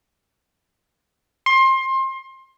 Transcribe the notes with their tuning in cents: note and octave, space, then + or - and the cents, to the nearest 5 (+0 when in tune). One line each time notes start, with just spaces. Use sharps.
C6 +25